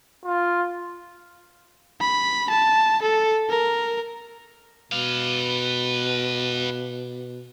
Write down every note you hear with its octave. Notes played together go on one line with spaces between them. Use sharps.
F4
B5
A5
A4
A#4
B2 B4 F5